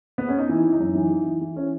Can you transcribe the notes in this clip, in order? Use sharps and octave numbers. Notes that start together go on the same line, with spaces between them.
B3
C#4
D#4
E3 E4
E3
D#4
F#2
E3
E3
E3
E3
E3 C#4